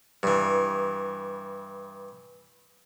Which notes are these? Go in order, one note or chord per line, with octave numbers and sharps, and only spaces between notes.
G2 E3